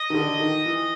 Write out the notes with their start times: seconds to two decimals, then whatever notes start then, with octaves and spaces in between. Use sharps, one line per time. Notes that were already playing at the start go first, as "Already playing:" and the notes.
Already playing: D#5
0.10 D#3
0.14 D3
0.40 D#3
0.66 E3